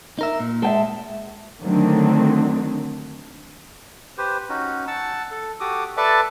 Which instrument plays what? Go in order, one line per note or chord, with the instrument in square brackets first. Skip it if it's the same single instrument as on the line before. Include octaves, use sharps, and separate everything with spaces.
[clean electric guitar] D#4 A#4 E5
A#2
[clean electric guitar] G#3 [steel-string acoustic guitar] E5 G5 A5
[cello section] D3 D#3 F#3 A3 C4 D4
[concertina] G4 B4 C5
C#4 D#4 F#4
F#5 A5 E6
A4
F#4 G4 A4 D6 D#6
A4 B4 D5 E5 A5